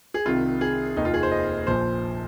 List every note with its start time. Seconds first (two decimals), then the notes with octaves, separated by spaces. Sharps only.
0.14 G#4
0.25 C2 C3 D#3 F4
0.61 G#4
0.96 F1 D#2 D#3 D#4
1.05 F4
1.14 G#4
1.23 C5
1.31 D#5
1.67 A#1 A#2 F3 C5